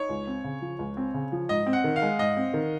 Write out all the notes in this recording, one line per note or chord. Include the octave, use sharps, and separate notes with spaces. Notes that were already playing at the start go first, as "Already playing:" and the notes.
Already playing: D#4 C#5
C#2
C4
C#3
F3
C#2
C4
C#3
F3
G#2 D#5
C4
F#5
D#3
F5
G#3
G#2 D#5
C4
D#3